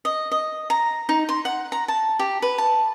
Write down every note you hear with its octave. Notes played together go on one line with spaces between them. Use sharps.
D#5
D#5
A#5
D#4
C6
F#5
A#5
A5
G4
B4
A5